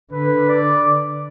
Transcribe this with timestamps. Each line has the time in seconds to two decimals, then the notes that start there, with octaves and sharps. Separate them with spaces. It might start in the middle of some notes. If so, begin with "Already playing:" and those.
0.12 D3 B4
0.48 D5